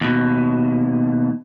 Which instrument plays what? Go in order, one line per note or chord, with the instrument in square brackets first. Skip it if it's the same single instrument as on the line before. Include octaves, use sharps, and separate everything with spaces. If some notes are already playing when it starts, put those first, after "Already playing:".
[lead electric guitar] D#2 B2